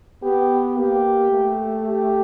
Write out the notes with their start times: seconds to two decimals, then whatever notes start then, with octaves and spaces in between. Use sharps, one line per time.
0.23 B3 G4
0.77 A#3 G4
1.31 A3
1.86 G4